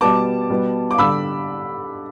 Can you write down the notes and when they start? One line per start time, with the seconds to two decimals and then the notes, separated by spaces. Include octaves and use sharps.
0.01 B2 G3 B3 A5 D6
0.50 B2 G3 B3
0.91 D6
0.98 D3 G3 B5 E6